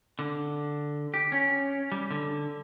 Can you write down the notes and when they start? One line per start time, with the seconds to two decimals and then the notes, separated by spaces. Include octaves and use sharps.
0.19 D3
1.14 G4
1.32 C#4
1.92 G3
2.11 D3